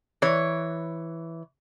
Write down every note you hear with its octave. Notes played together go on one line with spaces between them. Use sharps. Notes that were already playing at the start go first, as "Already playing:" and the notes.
E3 C#5